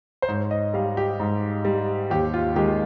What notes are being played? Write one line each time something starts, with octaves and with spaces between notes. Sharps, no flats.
C5
G#2 C#5
D#5
G3 F5
G4
G#2
G3
D#2 G4
F4
D#3 G#3 G4